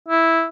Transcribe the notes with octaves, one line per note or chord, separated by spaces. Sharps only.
E4